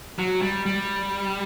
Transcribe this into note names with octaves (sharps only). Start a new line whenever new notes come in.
F#3
G3
G3